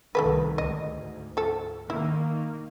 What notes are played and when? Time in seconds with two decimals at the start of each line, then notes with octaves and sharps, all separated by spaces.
0.15 C2 C3 D#3 A3 A4 B4
0.58 D2 G#2 D#5
1.37 F3 A4
1.90 D#3 A#3 E4